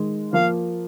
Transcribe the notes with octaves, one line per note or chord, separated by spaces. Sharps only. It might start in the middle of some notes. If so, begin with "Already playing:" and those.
Already playing: D#3 G#3
F3 A#3 F5